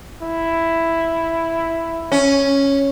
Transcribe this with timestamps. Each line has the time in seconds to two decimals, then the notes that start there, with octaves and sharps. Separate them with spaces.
0.22 E4
2.12 C#4